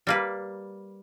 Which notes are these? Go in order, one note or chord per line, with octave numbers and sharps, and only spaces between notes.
G3 A#3 B4